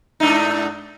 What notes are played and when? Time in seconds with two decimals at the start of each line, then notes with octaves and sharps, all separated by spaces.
0.20 G#2 D4 D#4